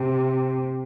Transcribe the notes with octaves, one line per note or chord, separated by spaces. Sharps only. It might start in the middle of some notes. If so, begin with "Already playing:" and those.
Already playing: C3